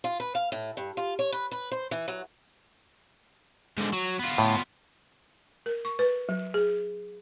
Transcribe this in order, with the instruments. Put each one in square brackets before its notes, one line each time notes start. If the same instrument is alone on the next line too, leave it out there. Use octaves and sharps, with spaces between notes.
[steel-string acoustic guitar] F4
B4
F5
A2
G2
F4
C#5
B4
B4
C5
E3
F#3
[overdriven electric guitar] G#2 D3
F#3
B3 F4
[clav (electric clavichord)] A2
[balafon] A#4
C#6
B4
F#3
G#4